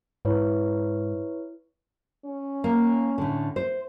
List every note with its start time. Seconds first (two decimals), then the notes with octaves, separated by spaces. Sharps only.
0.25 G#2 E4 B4 C#5
2.25 C#4
2.64 A#3
3.18 A2 D3
3.56 C5